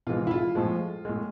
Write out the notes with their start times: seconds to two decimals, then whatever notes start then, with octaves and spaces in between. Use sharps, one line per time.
0.07 C3 E3 G#3 F4
0.27 E4
0.31 F4
0.55 A2 F3 G#3
1.05 A2 G#3